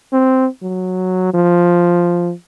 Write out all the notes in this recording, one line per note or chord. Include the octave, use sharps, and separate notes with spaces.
C4
F#3
F3